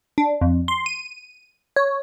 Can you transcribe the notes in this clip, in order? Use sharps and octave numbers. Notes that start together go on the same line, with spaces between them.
D4
F2
C6
D#7
C#5